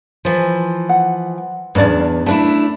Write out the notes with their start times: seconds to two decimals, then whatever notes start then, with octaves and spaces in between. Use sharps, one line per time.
0.25 E3 F3
0.89 F#5
1.75 E2 G2 C#4 D4 D5
2.26 A3 D4 E4 A5